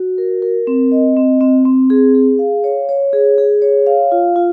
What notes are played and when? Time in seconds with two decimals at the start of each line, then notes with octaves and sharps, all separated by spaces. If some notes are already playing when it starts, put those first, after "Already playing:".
Already playing: F#4
0.18 A#4
0.42 A#4
0.67 C4
0.92 D#5
1.17 C4
1.41 C4
1.65 C4
1.90 G#4
2.15 G#4
2.39 F5
2.64 C#5
2.89 C#5
3.13 G#4
3.38 G#4
3.62 C#5
3.87 F5
4.12 F4
4.36 F4